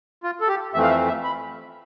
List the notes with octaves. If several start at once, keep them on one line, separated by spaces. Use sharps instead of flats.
F4
A4
G4
F2 E3 A3 C4 E5
F5
E5
E5
B5